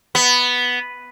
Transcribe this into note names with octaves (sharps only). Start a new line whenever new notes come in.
B3